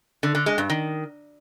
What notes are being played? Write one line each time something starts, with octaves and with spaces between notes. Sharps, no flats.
D3
D3
G#3
G2
D#3